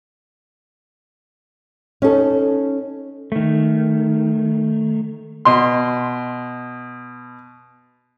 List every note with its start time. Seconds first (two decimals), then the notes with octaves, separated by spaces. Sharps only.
2.02 C#4 D#4 A4
3.32 D#3 A3
5.45 B2 C6